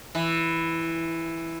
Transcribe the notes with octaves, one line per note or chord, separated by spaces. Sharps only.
E3